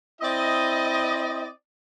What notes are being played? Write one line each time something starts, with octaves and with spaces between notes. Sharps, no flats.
C4 E4 D5 D#5